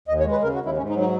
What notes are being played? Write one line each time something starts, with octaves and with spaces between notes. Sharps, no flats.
D#2 D#5
C#5
G#3
B4
C#3 A#4
F#4
D#2
E4
G#2 C#4
D#4
F#3
D#4